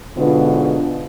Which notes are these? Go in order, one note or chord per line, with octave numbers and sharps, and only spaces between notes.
G#2 B2 D3 B3 F4